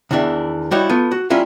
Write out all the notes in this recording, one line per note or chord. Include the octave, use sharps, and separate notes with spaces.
E2 D#3 E3 D4 E5
G3 D#4 E4 F#4 C#5
A3 B3 F4
F#4
G3 A#3 C#4 E4 F4 E5